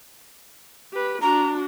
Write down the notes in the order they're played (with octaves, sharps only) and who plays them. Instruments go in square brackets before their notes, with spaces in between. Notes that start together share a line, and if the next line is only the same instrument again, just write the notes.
[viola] G4 B4
[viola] D4 F#4 [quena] A#5